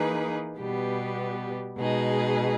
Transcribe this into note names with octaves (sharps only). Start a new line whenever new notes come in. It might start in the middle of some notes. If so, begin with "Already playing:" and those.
Already playing: E3 A#3 D#4 G#4 B4
B2 G3 B3 G4
B2 G#3 D#4 G#4